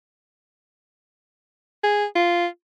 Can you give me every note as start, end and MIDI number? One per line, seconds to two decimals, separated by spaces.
1.84 2.05 68
2.15 2.46 65